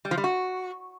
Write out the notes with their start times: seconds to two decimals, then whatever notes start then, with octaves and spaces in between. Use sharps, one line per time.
0.05 G3
0.11 F3
0.17 G3
0.24 F#4